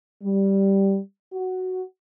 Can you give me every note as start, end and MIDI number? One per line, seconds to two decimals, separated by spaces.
0.23 0.99 55
1.33 1.83 66